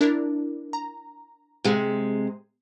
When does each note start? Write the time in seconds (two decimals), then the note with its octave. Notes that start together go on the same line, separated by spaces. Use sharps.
0.01 D4 E4 A#4
0.73 A#5
1.64 C3 G#3